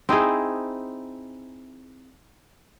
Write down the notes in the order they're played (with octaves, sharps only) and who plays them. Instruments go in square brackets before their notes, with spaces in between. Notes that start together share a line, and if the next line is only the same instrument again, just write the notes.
[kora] C4 D#4 E4 G#4